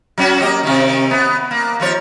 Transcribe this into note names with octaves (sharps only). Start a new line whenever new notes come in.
F#3 C#4 F#4
A#3 G4 D#5
C3 D#3
B3
A#3
D#2 F3 C#5